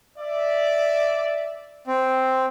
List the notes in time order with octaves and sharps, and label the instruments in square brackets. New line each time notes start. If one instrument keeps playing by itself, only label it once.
[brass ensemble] D5 E5
[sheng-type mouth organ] C4